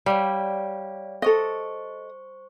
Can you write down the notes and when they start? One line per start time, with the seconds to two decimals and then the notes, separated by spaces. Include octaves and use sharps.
0.06 G3 C#5 D5 F5
1.22 A4 C5 D#5 C#6